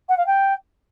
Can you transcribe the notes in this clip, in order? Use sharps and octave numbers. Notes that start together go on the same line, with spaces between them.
F#5
F5
G5